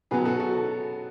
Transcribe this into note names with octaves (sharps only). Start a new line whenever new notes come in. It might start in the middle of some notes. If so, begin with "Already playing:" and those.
B2 F#3 B3 G#4 B4
F#4 A4
F#4 A4